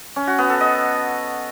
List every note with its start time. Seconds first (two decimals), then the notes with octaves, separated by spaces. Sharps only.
0.16 C#4
0.27 F#4
0.38 B3
0.49 A4
0.61 D#5